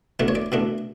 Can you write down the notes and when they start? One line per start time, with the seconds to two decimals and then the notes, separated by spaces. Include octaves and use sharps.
0.20 B2 A3 D4
0.28 C#5
0.35 D5
0.52 B2 A3 D4